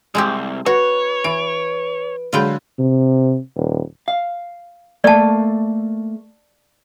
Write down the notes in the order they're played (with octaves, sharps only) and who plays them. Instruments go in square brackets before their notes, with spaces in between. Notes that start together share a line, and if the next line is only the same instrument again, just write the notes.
[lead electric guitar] C2 [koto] G#3 C4 G4
[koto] F#4 [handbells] B4 [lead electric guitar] C#5
[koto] E3 [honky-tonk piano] D7
[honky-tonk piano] D3 F#3 G#3 [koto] F4 B4 G5
[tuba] C3
D#1
[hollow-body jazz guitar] F5
[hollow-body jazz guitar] A3 A#3 A4 [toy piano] D5 A5